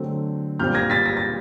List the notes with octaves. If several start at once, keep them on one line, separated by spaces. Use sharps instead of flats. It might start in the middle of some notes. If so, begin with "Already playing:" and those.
Already playing: D3 F#3 A3 C4
A#2 G3 C4 F6 G6
G#6 A#6
A6 B6
A#6
A6